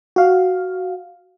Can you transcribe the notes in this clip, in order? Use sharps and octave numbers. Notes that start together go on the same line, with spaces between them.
F#4 F5